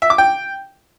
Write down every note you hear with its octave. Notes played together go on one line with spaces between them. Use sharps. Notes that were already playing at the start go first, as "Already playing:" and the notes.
E5
D6
G5